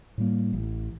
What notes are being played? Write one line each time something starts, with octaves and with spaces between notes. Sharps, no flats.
A2 G3 A#3
A1